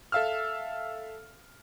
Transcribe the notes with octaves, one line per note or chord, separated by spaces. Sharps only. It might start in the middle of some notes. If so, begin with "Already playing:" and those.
A4 E5 F5 E6 F6